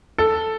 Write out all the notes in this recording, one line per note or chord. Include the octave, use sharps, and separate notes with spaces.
A4